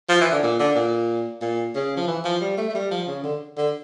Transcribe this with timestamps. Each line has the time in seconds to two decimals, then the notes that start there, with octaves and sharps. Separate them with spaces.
0.09 F3
0.21 E3
0.31 D3
0.43 A#2
0.59 D3
0.75 A#2
1.42 A#2
1.75 C#3
1.97 F3
2.07 E3
2.24 F3
2.41 G3
2.57 A3
2.69 A3
2.75 G3
2.91 F3
3.07 C#3
3.24 D3
3.57 D3